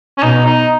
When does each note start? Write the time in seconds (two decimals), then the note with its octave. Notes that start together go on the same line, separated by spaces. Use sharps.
0.18 C#4
0.23 B2 D#4
0.46 D#4